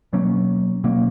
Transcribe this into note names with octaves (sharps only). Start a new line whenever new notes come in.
B2 F#3 A#3 C#4
B2 F#3 A#3 C#4